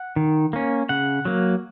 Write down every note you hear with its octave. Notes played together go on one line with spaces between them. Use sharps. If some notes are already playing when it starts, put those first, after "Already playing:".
Already playing: F#5
D#3
A#3 C#4
C#3 F#5
F#3 A#3